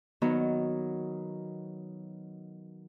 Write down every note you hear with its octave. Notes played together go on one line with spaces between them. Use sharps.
D#3 F#3 B3 D#4